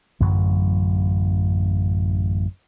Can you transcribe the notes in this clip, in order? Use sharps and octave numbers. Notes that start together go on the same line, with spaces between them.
A1 F#2 D3 F#3